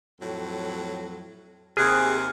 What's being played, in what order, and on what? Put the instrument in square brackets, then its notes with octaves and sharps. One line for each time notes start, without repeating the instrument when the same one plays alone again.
[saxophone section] F2 A2 F#3
[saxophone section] D#2 C3 [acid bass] G#4 [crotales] F6 F#6